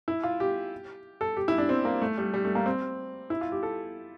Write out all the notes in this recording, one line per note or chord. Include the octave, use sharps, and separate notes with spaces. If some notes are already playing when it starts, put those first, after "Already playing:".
E4
F4
G4
A4
G4
E4
D4
C4
A#3
A3
G3
G3
A3
A#3
C4
E4
F4
G4
A4